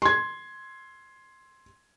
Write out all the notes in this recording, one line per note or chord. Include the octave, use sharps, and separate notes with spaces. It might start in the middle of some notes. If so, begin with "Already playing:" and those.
C6 G#6